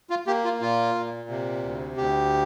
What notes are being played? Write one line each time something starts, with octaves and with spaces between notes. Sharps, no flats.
F4
A#3 G4
F4
A#2 F4
A#2
C3
D2
D2 G4